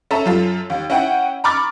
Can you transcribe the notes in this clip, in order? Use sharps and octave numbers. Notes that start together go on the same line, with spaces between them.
C#4 A4 E5 A5 A#5
F#2 F4 A4
D#2
C#4 E4 F#5 G5
A#5 B5 C#6 D6 F6 A6